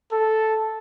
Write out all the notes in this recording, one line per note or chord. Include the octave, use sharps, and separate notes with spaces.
A4